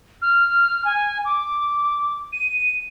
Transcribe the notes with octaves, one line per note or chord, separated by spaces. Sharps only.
F6
G#5
D6
D#7